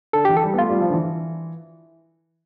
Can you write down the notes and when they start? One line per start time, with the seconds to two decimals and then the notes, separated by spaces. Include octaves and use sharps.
0.13 D3 A4
0.25 E3 G4
0.37 A4
0.43 G3
0.54 B3
0.58 A3 F4
0.70 G3
0.81 F3
0.89 D3
0.92 E3